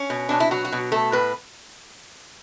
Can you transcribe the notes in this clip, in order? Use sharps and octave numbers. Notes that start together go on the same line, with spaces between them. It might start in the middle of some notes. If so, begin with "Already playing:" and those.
Already playing: C#4
B2
B2 D4
E4
F#3 F#4
F#4
B2
A3 A4
A2 B4